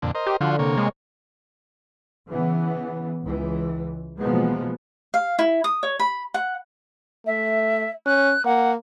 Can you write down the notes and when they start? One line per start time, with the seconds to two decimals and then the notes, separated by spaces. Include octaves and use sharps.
0.02 F2 A#2 D3
0.15 A#4 C5 D#5
0.27 G4
0.41 D3 F3 F4 F#4
0.59 C3 A#3 C#5
0.77 G#3
2.30 C#3 E3 B3
3.24 C#2 E3
4.20 B2 E3 F3 G#3 A#3 B3
5.14 F5
5.39 E4
5.64 D#6
5.83 C#5
5.99 B5
6.34 F#5
7.26 A3 E5
8.06 C#4 F#6
8.45 A#3 F#5